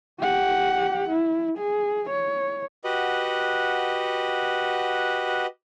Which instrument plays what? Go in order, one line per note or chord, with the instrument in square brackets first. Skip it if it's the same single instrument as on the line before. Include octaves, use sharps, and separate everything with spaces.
[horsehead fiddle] G4 F#5
E4
G#4
C#5
[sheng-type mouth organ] F#4 G4 B4 D#5 F#5